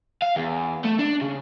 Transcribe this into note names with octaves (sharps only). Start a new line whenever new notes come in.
F5
E2
A3
D4
C#3